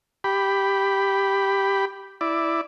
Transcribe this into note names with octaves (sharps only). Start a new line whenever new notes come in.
G4 B5
E4 D5